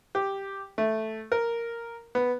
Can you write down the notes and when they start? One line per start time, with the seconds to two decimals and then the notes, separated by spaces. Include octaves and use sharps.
0.15 G4
0.78 A3
1.32 A#4
2.15 B3